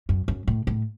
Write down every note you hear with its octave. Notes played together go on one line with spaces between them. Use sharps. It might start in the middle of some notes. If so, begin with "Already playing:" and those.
F#2
F#2
A2
A2